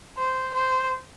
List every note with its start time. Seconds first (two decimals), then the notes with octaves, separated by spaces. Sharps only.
0.17 C5
0.54 C5